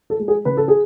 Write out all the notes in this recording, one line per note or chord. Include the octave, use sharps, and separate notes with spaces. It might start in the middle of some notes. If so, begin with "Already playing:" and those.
A4
G#3
G#4
C#3 B4
A4
G#4